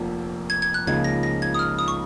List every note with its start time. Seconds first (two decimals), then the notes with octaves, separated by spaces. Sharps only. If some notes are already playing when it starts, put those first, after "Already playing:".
Already playing: F1 F2 F3 A#3
0.50 G#6
0.62 G#6
0.74 F#6
0.87 C#2 C#3 F3 A#3 D#4 G#6
1.04 A#6
1.23 A#6
1.42 G#6
1.54 D#6
1.59 F6
1.79 D#6
1.88 C#6